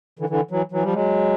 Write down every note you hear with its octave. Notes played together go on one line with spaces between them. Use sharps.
D3 E3
D3 E3
E3 F#3
E3 F#3
F3 G3
F#3 G#3